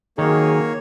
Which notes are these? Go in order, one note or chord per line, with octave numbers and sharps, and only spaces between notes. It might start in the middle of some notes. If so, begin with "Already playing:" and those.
D#3 F#3 A#3 D#4 G#4 C#5